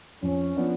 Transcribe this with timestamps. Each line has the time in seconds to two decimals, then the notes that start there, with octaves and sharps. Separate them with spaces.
0.22 F2 C#4
0.56 F3 B3 D4